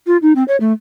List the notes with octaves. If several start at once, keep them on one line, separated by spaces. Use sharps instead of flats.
F4
D#4
C4
C#5
A3